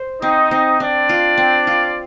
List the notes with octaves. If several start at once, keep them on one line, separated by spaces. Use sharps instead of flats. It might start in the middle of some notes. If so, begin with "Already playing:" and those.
Already playing: C5
C4 D#4 D#5
C4
C4 D4 D5
F4
C4
F4